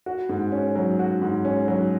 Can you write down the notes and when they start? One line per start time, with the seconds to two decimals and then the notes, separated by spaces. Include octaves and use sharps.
0.06 F#4
0.29 G#2
0.52 C#4
0.76 F#3
0.99 F#4
1.22 G#2
1.45 C#4
1.68 F#3